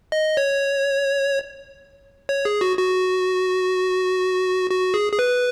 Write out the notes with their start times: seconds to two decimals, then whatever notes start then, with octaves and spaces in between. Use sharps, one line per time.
0.12 D#5
0.37 C#5
2.29 C#5
2.45 G#4
2.61 F#4
2.77 F#4
4.70 F#4
4.94 G#4
5.12 G#4
5.19 B4